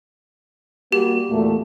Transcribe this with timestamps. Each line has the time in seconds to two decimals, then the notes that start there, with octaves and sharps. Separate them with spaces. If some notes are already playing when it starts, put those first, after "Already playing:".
0.92 G3 A#3 F#4 G4
1.30 E2 A#2 A3